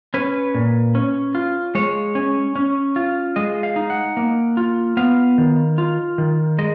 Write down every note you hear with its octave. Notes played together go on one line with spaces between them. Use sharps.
C#4 B4
A#2
C#4
F4
G#3 C#5
C#4
C#4
F4
G#3 D#5
F5
D#4
F#5
A#3
F4
B3 F5
D#3
F4
D#3
G#3 D#5